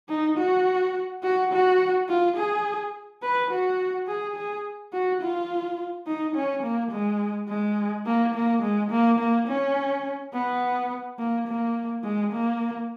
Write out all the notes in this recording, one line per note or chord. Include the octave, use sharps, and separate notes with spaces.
D#4
F#4
F#4
F#4
F4
G#4
B4
F#4
G#4
G#4
F#4
F4
D#4
C#4
A#3
G#3
G#3
A#3
A#3
G#3
A#3
A#3
C#4
B3
A#3
A#3
G#3
A#3